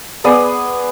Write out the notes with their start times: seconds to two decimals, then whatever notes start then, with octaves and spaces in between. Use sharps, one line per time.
0.24 B3 G#4 D5 D#6